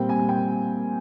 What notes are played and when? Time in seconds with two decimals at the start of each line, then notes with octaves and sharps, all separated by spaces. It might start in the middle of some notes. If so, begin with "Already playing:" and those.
Already playing: A#2 G3 C4 G5
0.09 G#5
0.29 G5